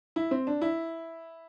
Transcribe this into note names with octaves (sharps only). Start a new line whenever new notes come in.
E4
C4
D4
E4